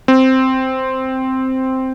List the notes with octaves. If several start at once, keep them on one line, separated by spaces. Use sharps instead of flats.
C4